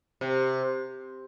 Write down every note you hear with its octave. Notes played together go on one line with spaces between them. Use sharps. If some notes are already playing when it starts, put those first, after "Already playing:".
C3